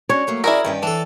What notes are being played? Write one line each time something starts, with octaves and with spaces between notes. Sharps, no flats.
C#4 D4 F#4 C#5
F#3 A3 A#3
C#4 E4 F#4 G#4 A#4 D5
G2 D#3 C#4 G5
E3 D4 A4 A5